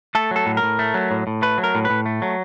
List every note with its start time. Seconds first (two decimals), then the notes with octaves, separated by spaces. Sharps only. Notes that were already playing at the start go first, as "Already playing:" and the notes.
0.15 A3 A4
0.31 F#3 A4
0.46 A2
0.57 A#4
0.63 A2
0.79 A3
0.94 F#3
1.11 A2
1.27 A2
1.42 A3 B4
1.58 F#3
1.64 A#4
1.75 A2
1.85 B4
1.90 A2
2.06 A3
2.22 F#3